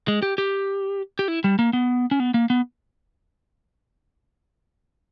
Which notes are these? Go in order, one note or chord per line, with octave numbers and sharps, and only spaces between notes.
G#3
G4
G4
G4
E4
G3
A#3
B3
C#4
B3
A#3
B3